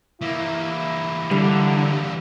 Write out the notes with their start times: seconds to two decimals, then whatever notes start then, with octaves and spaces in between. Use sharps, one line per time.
0.22 E3 A#3 E4
1.31 D3 G3